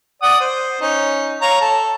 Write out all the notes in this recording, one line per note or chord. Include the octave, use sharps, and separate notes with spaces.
D5 F#5 D#6
C5
C#4 D#4
C#5 F5 A#5
A4